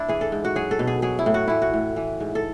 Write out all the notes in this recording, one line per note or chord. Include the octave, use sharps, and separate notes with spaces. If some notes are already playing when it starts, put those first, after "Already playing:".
Already playing: D4 E4
E3 G#4
A4
G#2
F#4
F#3 G#4
A4
B2
G#4
F#3 G#4
E4
A2
F#4
E3 E4
F#4
A2
E3
G#2
A4